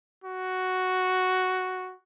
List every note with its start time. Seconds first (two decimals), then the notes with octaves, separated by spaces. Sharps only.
0.24 F#4